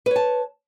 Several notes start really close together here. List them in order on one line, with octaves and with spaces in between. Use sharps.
B4 C#5 A5